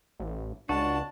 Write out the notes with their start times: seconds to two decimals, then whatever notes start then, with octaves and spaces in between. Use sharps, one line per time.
0.20 A1
0.69 C#2 D4 F#4 A5